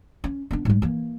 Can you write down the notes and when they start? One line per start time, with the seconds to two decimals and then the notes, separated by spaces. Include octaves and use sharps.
0.24 C#4
0.51 B3 D4
0.65 G#2 G3
0.82 E3 A#3